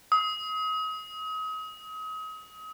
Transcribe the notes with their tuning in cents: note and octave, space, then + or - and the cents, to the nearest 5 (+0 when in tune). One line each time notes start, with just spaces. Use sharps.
D#6 +35